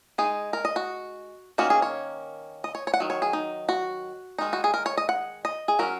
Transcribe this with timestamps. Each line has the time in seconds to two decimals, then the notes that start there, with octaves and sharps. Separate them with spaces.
0.18 G#3 D#4 G#4
0.53 A#4
0.65 D#5
0.76 F#4
1.58 D#3 A#3 C#4 F#4
1.70 G#4
1.82 C#5
2.64 D#5
2.75 C#5
2.87 C#5
2.94 F#5
3.00 D#3 F#3
3.10 C#5
3.22 G#4
3.33 D#4
3.69 F#4
4.38 D#3 G#3 D#4
4.53 F#4
4.64 G#4
4.74 A#4
4.86 C#5
4.97 D#5
5.09 F#5
5.45 D#5
5.68 G#4
5.79 F#3 C#4 A#4